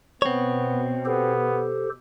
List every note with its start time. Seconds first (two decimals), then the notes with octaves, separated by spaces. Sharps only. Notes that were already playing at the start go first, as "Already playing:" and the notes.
0.22 B2 B3 C4 C#5
1.05 B3 G4 A4 C5